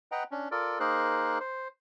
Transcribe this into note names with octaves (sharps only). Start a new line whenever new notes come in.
B4 D#5 F#5 G5 A#5
C#4 D4
F4 A4 A#4 D5
A#3 D#4 G#4 A#4 C5 F#6
C5